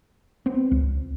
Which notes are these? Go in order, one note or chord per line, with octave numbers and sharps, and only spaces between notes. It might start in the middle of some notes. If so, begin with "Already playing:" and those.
B3 C4
C#2